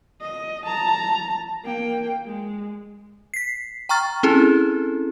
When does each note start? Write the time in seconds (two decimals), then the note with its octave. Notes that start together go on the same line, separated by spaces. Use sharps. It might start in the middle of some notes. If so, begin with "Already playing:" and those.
0.21 D#5
0.66 A5 A#5
1.65 A#3 G5
2.26 G#3
3.34 B6 C7
3.89 G5 A#5 C#6 F6 A6
4.23 C4 C#4 E4 G#4 A4